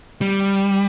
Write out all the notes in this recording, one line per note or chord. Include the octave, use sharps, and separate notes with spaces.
G3